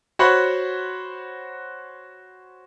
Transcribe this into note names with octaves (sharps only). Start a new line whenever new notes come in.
F#4 C5 C#5 F#5 B5 C#6